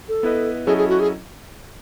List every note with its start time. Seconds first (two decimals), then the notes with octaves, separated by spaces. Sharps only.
0.09 A4
0.23 B3 E4 B4 D#5
0.66 F#3 C#4 E4 G#4 A4 D#5
0.77 G#4
0.89 F#4
1.00 G#4